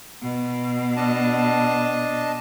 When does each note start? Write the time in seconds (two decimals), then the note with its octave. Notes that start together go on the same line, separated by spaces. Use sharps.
0.22 B2
0.96 D4 D#5 A5